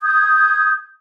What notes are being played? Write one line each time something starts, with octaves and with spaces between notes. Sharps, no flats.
D#6 G6 G#6